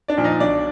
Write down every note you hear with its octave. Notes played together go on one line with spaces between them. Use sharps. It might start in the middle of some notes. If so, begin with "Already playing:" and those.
D4 D5
A#2 F3
D#4 D#5
B1 D4 D5